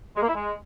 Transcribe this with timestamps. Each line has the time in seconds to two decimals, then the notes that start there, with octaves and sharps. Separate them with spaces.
0.16 G#3
0.22 A#3
0.28 E4
0.34 G#3